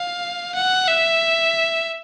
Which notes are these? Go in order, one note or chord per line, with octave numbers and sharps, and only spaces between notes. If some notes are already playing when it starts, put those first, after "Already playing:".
Already playing: F5
F#5
E5